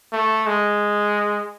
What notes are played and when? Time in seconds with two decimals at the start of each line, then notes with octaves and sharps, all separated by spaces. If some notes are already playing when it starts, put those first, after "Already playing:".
0.13 A3
0.46 G#3